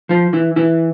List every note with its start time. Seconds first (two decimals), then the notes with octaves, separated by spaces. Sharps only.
0.09 F3 F4
0.33 E3 E4
0.56 E3 E4